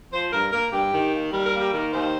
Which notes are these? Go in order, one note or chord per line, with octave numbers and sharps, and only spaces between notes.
F3 C5
G2 A#4
A#3 A#4
G2 G4
D#3
D#2
G3 A#4
A#4
A#3
G4
D#3 A#4
D#2 C5